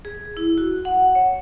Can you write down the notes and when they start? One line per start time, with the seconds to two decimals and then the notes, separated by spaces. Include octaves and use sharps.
0.05 G#4
0.37 E4
0.58 F#4
0.85 F#5
1.15 C#5